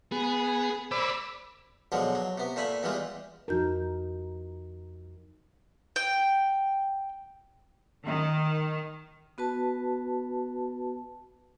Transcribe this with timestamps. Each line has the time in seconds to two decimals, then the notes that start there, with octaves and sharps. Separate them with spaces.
0.12 B3 G#4
0.92 C5 D5 B5 D6 E6
1.92 B2 D3 F3 F#3 G#3
2.15 F#3
2.38 C3 B3
2.56 A#2 A3 E5 G#5 B5
2.83 E2 E3 G3 G#3 F4
3.48 F2 F3 D#4 F#4 A#4 G6
5.96 G5
8.04 D#3
9.38 B3 F#4 B4 A5